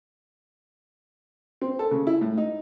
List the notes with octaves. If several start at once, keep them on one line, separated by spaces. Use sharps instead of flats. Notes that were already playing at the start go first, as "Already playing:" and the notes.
C4
A4
C#3
E4
A2
D#4